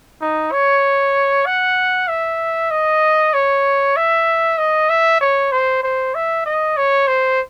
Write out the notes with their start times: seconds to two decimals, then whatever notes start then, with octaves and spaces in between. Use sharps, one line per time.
0.21 D#4
0.52 C#5
1.46 F#5
2.08 E5
2.71 D#5
3.33 C#5
3.96 E5
4.58 D#5
4.89 E5
5.21 C#5
5.52 C5
5.83 C5
6.15 E5
6.46 D#5
6.77 C#5
7.08 C5